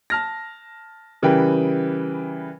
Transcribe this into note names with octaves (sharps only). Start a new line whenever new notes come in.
A5 F6 A#6
C#3 E3 G3 A#4 B4 G5